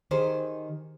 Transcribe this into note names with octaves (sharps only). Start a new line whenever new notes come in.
D#3 G4 G#4 C5